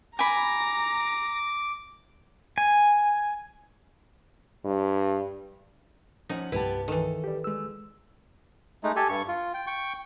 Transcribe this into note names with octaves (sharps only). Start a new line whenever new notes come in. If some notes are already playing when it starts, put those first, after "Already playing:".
G#5 A#5 B5 D6 A#6
G#5
G2
F3 C#4 D#4 F#5
C2 G2 B3 E4 G4 B4 A5
D#3 E3 A4
G4 D5
G#3 E6
G#3 A3 D#4
G4 A4 G#5
G2 C#6
F4
G5
G5 C#6